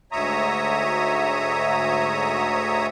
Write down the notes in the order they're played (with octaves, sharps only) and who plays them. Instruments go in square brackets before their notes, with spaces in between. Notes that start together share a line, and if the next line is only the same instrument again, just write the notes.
[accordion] D2 G#2 C#5 E5 A#5 D#6